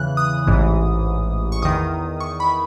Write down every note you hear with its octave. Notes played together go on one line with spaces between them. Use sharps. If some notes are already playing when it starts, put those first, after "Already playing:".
Already playing: E2 C#3 E3 F#6
D#6
A1 G#2 E3
C#6
E2 D#3 D#6
C#6
B5